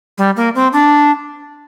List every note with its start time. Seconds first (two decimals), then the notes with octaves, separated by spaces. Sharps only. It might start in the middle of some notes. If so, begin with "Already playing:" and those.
0.18 G3
0.36 A#3
0.55 C4
0.73 D4